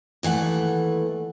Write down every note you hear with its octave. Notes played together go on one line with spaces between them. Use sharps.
D#2 E3 A3 F#5